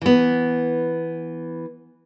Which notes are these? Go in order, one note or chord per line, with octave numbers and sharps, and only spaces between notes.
E3 B3